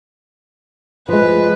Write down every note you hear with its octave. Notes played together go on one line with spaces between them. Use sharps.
F3 G#3 B4